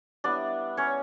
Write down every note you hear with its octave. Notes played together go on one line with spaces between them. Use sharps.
G3 B3 D4 E4 D5
C#4 C#5